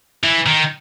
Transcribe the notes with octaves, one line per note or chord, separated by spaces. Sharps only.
E3
D#3